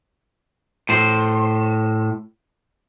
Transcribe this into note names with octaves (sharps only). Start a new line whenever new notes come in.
A2 C5